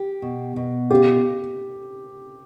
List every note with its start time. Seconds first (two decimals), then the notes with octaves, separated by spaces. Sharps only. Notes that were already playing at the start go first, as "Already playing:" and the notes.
Already playing: G4
0.22 B2
0.56 B2
0.90 F4 G4